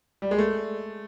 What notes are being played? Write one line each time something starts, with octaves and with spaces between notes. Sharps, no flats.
G3
G#3
A3